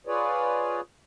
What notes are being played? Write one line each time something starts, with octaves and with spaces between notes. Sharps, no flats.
F4 G#4 B4 C#5 D5